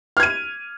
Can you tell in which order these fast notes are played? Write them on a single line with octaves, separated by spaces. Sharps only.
F6 G#6 D#7